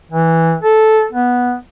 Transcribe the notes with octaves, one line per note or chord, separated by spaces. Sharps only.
E3
A4
B3